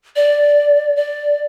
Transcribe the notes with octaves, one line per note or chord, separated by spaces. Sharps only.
D5
D5